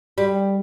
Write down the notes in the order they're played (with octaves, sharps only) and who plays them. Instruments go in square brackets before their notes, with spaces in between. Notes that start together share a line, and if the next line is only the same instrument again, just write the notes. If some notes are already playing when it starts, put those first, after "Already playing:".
[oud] G3